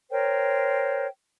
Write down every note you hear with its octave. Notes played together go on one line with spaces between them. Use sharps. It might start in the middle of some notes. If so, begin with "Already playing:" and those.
A#4 C5 C#5 G5